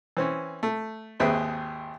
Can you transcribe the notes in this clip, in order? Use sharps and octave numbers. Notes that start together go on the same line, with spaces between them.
E3 C4 C#4
A3
G#1 D#2 C4 G#4 B4 E5